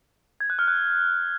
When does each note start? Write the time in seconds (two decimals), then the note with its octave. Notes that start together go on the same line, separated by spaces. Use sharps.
0.40 G#6
0.50 F#6
0.59 F6
0.68 F#6